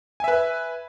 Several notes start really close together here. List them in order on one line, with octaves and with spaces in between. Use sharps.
G#5 E5 B4